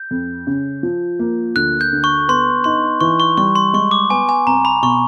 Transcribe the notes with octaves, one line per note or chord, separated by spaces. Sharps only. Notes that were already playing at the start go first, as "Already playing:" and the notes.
Already playing: G6
F2
C#3
F3
A#3
D2 F#6
G6
D3
C#6
B3 C6
D#4 C6
E3 C#6
C#6
G3 C#6
C6
G#3 C#6
D6
B3 G#5
G#5
C2 A#5
B5
B2 C#6